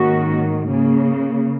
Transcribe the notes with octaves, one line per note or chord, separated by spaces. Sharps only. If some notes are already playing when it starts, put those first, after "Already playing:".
Already playing: G#2 D#3 A#3 C#4 F#4
C#3 A#3